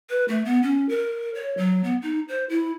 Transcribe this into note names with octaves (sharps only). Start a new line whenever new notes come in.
B4
A3
B3
C#4
A#4
C#5
F#3
B3
D#4
C5
E4